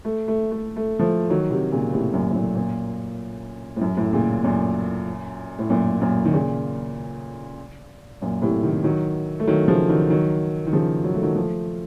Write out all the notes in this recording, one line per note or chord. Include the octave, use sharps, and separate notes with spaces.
A3
A3
A3
A3
F3 A3
D#3 F#3
C3 D#3
A#2 C#3
A2 C3
F#2 A#2
A2
F#2 A#2
F#2 A#2
A2
F#2
A2
A#2 C#3
F#2 A#2
A2
F#2 A#2
F#2 A#2
D#3
A#2 C#3
F#2 A#2
A2 C3
C3 D#3
D#3 F#3
A3
D#3 F#3
C#3 F3
D#3 F#3
D#3 F#3
D#3
C#3 F3
F#3
A3
D#3 F#3
F3 A3